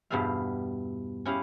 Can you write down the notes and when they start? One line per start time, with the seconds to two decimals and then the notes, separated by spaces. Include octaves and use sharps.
0.10 E2 G2 B2 G3 E5 F5
1.25 C#4 E4 G4 F5